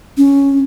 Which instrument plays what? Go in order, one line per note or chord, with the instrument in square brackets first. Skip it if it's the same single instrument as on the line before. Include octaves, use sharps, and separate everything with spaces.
[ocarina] C#4